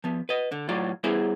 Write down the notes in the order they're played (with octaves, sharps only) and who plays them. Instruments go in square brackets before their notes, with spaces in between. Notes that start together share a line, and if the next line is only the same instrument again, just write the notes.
[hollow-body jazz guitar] F3 B3
B4 D#5
D3
A2 F#3 F4 D5
G3 B3 E4 G#4 C5